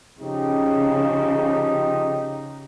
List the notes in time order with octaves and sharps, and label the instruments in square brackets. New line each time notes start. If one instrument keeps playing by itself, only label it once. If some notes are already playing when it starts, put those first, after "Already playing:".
[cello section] C#3 [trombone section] F3 D#4 G4